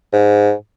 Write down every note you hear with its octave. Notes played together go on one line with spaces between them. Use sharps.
G#2